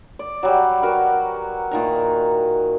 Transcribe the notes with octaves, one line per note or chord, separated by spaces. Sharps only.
D5
F#3 G3
F#4 A#4 B4
A#2 D#3 A#5